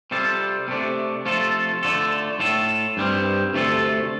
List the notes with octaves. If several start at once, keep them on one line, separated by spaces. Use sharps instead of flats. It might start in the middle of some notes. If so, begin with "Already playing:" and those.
C3 G3 F4 A4
C3 A3 D4
C3 F3 A3 F4 A4
D3 A3 F4 A4
A2 A3 F4 A4
G2 G3 C4
D2 C3 A3 F4 A4